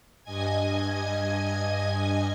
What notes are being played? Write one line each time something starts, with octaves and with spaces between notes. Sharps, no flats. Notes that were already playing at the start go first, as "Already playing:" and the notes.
G2 D#5 G#5 G#6